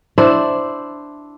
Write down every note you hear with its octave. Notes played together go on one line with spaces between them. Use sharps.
D4 E4 C5